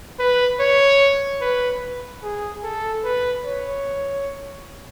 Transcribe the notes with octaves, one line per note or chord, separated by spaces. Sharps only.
B4
C#5
B4
G#4
A4
B4
C#5